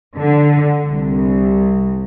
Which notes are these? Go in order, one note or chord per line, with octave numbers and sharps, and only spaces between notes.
D3
C2